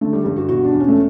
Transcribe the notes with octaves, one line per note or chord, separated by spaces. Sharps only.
D3 A3
G3
G2 G3
F#4
B2 F#4
D4
E2
C#4
A3